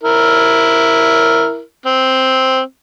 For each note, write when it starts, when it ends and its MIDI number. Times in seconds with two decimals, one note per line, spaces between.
0.03 1.61 64
0.03 1.61 70
1.86 2.60 60